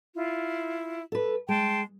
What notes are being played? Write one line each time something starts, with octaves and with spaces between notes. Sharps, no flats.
E4 F4
A4 B4
G#3 G5 A5 C6